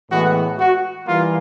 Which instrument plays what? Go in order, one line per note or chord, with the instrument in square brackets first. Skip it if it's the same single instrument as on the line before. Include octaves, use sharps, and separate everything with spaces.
[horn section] A2 E3 G#3 B3 F#4
F#4
E3 G3 A#3 F4